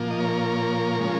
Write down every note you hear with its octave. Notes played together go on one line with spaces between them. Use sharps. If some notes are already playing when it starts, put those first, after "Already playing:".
Already playing: A#2 F3 A#3
D#5
A#4 C#5
C#3 F3 G#3